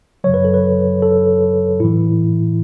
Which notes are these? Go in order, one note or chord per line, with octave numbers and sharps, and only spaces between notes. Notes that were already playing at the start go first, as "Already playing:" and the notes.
F#2 C#3 F#3 C#5
B4
A4
B4
A4
A2 E3 E4